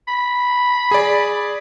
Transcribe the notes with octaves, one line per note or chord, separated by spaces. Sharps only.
B5
G#4 D5